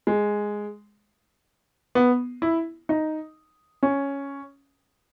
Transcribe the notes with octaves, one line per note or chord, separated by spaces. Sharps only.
G#3
B3
E4
D#4
C#4